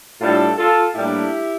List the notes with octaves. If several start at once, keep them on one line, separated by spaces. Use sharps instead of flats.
A2 G3 D4 F4 A4
F4 A4
A2 G3 A#3 D4 E4 G4